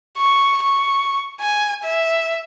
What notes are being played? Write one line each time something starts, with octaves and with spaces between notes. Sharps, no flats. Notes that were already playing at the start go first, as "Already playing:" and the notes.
C#6
C#6
G#5
E5